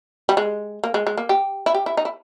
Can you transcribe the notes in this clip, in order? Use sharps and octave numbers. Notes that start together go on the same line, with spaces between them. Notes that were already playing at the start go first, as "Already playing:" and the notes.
G3
G#3
A#3
G#3
G#3
A#3
G4
E4
G4
E4
D#4
E4